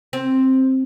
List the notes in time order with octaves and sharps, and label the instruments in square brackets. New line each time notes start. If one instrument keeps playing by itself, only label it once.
[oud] C4